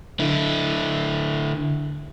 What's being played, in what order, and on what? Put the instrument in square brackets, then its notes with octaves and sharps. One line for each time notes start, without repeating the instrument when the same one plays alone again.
[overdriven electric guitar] D3 E4